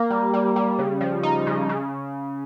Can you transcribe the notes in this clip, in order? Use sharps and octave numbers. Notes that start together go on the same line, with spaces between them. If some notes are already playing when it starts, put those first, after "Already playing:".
Already playing: A#3
G3
G3
G3
C#3
F3
D#4
C#3
C#3